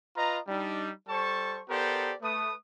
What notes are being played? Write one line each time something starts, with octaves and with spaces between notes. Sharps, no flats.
F4 B4 D#5 A#5
G3 D4 D#4
G3 A4 C5 A5 C#6
B3 G4 A4 A#4 C5 D5
A3 B4 D#6